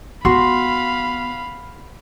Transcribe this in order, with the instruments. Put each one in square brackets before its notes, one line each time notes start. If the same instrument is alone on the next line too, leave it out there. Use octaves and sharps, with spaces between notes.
[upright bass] B3 [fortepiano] F#4 [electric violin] F5 B5 [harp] C6